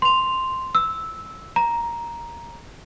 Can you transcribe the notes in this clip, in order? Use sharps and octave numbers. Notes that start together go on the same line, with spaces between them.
C6 F7
E6
A#5